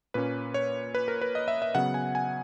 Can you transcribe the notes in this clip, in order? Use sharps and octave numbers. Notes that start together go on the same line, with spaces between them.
A#2 A#3 C#4 B4
C#5
B4
A#4
B4
D#5
E5
E5
C#3 F#3 B3 F#5
G#5
G#5